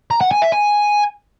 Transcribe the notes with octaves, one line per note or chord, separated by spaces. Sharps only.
A#5
F#5
G#5
E5
G#5